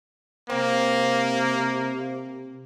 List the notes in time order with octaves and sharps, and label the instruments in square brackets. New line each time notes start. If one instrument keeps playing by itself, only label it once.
[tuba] C3 [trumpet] A#3 [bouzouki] C4